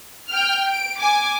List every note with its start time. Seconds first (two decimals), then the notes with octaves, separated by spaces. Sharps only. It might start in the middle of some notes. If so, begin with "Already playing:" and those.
0.30 G5 F6
0.69 D7
1.00 G#5 D6